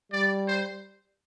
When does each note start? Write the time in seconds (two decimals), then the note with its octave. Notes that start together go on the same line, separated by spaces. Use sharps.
0.12 G3 D5
0.48 C5